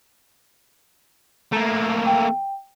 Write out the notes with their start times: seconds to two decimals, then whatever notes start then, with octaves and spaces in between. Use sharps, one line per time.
1.52 A3 A#3 A#5
2.06 G5